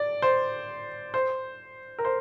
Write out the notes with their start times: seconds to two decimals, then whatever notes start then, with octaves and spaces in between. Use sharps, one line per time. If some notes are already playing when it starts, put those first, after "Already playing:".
Already playing: D5
0.22 C5
1.14 C5
1.99 A#4
2.05 C5